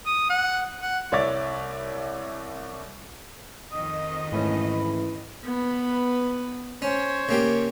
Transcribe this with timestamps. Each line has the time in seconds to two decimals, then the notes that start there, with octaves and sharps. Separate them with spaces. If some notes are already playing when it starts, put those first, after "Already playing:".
0.06 D#6
0.30 F#5
0.81 F#5
1.12 C2 C#5 D5 E5 D6 A6
3.71 F2 D#3 D#5 D#6
4.32 G#2 E3 A3 C#4 B5
5.44 B3 B4
6.82 C#4 C5 C#5
7.29 C#3 A#3 G4